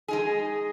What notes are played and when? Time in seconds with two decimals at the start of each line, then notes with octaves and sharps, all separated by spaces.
0.08 G#3 D#4 G#4